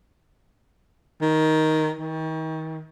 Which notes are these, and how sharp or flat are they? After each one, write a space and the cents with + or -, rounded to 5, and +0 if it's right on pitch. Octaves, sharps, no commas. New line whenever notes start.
D#3 +10
D#3 +35